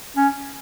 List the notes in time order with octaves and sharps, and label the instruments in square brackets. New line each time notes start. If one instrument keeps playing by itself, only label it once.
[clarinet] C#4